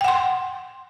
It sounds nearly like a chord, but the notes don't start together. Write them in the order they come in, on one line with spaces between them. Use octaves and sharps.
G5 F#5 C6